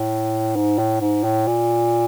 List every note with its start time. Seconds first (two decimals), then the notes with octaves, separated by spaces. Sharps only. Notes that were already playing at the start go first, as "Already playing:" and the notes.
Already playing: A2
0.56 G#2
0.79 A2
1.01 G#2
1.24 A2
1.47 A#2